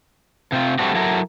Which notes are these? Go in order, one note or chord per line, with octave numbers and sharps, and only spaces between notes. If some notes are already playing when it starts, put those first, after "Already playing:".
C3 C4 F4
G3 A3 C4 D4 F#4
F#3 E4 A4 A#4